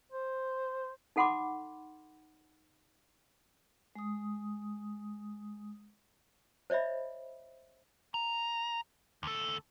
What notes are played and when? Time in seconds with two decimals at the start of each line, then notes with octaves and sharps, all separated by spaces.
0.12 C5
1.16 D#4 A4 F#5 B5 C6 D6
3.95 G#3 D#6
6.70 C5 C#5 D#5 E5 B5
8.14 A#5
9.23 D2 A4